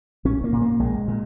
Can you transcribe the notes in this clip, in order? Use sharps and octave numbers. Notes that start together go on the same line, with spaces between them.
A#1 C#4
A#3
A#2
A#3
A#1 G#3
A#2